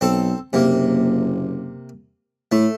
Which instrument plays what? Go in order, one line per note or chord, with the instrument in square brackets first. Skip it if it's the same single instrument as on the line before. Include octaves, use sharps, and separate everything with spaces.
[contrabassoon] B1 [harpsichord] C4 A4
[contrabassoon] F#1 [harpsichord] C3 A#3
[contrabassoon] A2 [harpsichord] A3